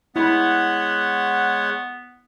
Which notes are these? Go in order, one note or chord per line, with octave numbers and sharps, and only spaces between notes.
G#3 B3 E4 C#5 F#5 B5